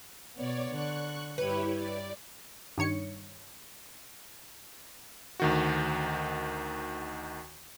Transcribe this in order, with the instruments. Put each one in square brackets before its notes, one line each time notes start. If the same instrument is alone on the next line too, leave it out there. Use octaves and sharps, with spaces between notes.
[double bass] B2 B3 [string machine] C#5 D5
[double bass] D3 [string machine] C#6 F#6
[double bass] G2 [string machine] E4 G4 C#5 [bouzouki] B4
[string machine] D5
[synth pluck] G2 D#3 C#5 C#7
[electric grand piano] D2 D#3 F#4